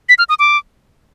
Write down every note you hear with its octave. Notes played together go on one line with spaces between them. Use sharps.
B6
F6
D#6
D6